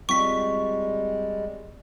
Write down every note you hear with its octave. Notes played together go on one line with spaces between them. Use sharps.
G3 G#3 C4 F4 E5 C#6 B6